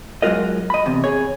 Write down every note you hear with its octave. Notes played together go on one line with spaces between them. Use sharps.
F#3 G#3 F4 F#4 A#4 D#5
D#5 B5
E2 C3
G#4 C#5